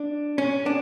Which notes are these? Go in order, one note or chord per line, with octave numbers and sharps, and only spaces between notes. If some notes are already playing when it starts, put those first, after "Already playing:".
Already playing: D4
C#4
D4